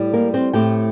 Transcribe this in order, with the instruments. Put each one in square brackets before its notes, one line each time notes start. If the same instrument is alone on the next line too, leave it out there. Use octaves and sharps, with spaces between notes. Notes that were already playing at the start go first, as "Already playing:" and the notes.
Already playing: [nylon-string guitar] A2 G3
A#3 A#4
C4 C5
A2 A3 C4 G4 G5